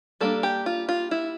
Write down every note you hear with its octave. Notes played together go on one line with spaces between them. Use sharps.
G3 A#3 D4 A4
G4
F4
F4
E4